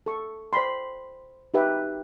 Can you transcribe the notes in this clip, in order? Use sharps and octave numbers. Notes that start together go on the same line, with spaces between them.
A4 C#6
C5 D5 G5 B5 C6
D#4 F#4 G4 B4 E5 G5